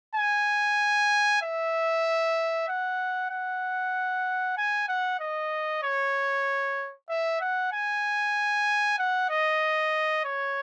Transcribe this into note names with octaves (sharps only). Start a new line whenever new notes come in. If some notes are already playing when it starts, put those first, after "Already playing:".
G#5
E5
F#5
F#5
G#5
F#5
D#5
C#5
E5
F#5
G#5
F#5
D#5
C#5